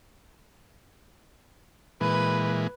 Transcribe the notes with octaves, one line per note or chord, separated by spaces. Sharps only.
A#2 E3 G#3 B4